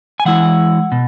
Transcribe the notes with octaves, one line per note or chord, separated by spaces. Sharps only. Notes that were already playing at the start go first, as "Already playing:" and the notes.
G#5
E3 G#3 E4 F#5
B2